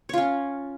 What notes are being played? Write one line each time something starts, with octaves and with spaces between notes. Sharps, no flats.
C#4 F4 C#5